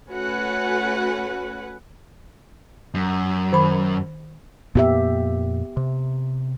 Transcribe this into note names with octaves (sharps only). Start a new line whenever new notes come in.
A3 C#4 F#4 B4 F#5 G#5
F#2
D#3 B5
F2 A#2 A#3 B3 G4 E5
C3